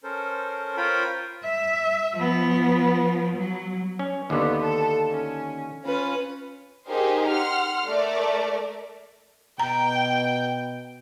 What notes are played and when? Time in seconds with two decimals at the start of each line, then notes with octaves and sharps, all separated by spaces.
0.04 C#4 A4 A#4 C5
0.77 F4 A#4 C5 C#5 G5 B5
1.44 E5
2.17 F3 B3
3.36 F#3
3.99 C#4
4.30 D#2 D3 B3
4.63 A4
5.09 C#4
5.85 C#4 F4 B4
6.87 D#4 G4 G#4 A#4 C5
7.28 F#5 C6 F6
7.87 A3 A#4 D5
9.60 B2 G5 A#5